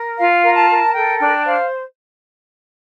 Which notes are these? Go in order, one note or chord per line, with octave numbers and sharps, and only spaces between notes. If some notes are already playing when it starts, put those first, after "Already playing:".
Already playing: A#4
F4 F5
A#4
A5
A#4
A4 G5
D4 G5
C5 F5